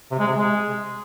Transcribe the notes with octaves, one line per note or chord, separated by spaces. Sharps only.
C3
G#3
C3
G#3